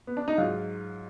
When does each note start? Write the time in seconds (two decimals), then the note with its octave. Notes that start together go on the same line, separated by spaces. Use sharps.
0.07 B3
0.17 D4
0.28 D#4
0.38 G#2 F#3 F4